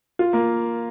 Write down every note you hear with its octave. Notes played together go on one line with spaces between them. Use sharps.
F4
A#3